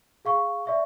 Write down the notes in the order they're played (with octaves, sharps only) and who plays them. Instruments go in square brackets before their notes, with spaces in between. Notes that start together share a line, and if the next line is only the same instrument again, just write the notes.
[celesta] G#4 F5 C#6
D5 E5 C#6